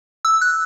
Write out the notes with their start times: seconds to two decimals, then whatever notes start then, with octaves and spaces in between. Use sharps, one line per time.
0.25 E6
0.41 F#6